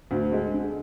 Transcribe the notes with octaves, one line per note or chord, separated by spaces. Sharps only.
D2
G#3
D3